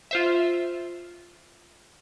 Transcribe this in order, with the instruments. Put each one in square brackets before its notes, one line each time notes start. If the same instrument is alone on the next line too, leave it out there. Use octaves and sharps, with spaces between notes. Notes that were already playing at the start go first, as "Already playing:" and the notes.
[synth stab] F4 C5 E5